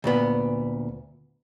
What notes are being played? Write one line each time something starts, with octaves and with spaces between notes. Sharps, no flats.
D2 A#2 B3